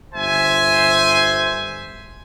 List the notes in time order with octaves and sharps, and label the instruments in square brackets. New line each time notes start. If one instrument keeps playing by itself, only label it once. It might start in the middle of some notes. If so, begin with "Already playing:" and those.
[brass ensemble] G1 C5 E5 G#5